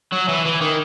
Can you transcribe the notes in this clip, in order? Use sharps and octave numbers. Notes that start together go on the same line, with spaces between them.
F#3
E3
E3
D#3